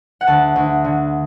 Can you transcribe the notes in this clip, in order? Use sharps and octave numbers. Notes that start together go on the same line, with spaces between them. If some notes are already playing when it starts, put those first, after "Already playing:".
F#5
D2 A5
D2
D3